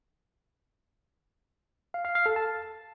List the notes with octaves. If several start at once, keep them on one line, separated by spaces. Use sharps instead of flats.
F5
F5
F5
A4
A5